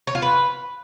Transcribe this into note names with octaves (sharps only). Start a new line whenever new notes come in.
C#5
F4
B4